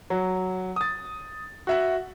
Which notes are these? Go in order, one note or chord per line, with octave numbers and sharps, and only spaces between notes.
F#3
D#6 A6
F#4 E5 F#5